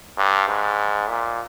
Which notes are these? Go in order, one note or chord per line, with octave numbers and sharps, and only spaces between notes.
G2
G#2
A#2